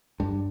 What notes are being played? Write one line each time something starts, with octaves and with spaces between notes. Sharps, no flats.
G2